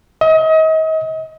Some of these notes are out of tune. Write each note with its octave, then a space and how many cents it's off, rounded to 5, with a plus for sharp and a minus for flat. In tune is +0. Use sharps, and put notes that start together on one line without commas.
D#5 +35